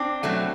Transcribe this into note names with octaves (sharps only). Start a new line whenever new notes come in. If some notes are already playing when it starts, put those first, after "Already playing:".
Already playing: C4 D4
B2 F#3 A3